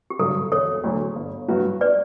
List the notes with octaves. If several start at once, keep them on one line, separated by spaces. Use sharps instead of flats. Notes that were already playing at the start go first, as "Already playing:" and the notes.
G4
G2 D3 F#3 A4
E1 A4 C#5
D2 D3 F#3
G1
G2 F#3 B3 F#4
B4 D5